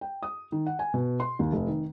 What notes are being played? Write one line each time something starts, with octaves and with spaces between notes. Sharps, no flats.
G5
D#6
D#3
F#5
G#5
B2
C6
D#2
F1
D#3